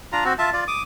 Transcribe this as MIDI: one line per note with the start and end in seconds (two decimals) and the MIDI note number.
0.12 0.24 62
0.12 0.24 65
0.12 0.24 82
0.24 0.33 60
0.24 0.33 66
0.38 0.50 65
0.38 0.50 76
0.38 0.50 81
0.53 0.64 65
0.53 0.64 74
0.68 0.83 86
0.68 0.83 87